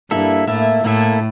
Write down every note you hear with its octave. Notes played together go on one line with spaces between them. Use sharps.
G2 A#3 E4 A4 E5
A2 A#3 E4 A4 E5
A2 A#3 E4 A4 E5